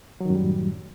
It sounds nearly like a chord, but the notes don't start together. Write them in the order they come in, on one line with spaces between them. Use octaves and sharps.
F#3 D#3 F#2 G3 A2